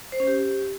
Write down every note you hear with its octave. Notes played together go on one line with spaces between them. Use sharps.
C5
C#4
G4